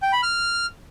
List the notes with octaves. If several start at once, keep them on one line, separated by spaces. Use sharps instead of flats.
G5
B5
F6